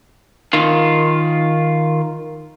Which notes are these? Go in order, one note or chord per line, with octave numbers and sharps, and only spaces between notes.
D#3 F4